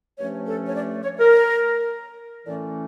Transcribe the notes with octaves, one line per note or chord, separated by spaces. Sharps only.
G2 F3 A3 C#4 C#5
A4
C#5
D5
C#5
A#4
A2 E3 A3 C#4 D5